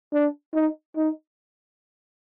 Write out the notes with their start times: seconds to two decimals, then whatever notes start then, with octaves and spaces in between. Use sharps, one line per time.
0.14 D4
0.54 D#4
0.97 D#4